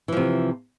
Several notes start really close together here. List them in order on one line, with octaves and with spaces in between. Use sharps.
E3 F3 C3